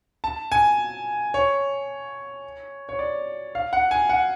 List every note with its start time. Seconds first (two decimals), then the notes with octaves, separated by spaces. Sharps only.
0.24 A5
0.52 G#5
1.34 C#5
2.89 C#5
2.99 D5
3.55 F5
3.73 F#5
3.91 G#5
4.09 F#5